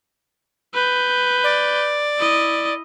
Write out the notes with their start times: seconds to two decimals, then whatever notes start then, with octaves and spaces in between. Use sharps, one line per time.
0.74 B4 G6
1.44 D5
2.18 E4 D#5